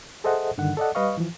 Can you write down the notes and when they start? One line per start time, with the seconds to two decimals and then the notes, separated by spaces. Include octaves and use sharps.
0.24 G#4 A4 C5 D#5 E5 F#5
0.58 G2 D3 D#3 F#5
0.77 A4 D5 D#5 F#5
0.95 G3 B4 D#5 F5 C#6
1.18 E3 F3